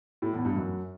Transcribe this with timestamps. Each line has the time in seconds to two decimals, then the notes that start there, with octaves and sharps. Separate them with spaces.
0.22 A2
0.33 E2
0.45 G2
0.56 F#2